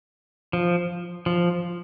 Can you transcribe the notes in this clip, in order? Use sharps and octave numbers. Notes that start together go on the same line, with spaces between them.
F3
F3